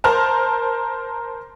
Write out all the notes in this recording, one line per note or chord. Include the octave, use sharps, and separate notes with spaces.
A#4 C5 A5 F6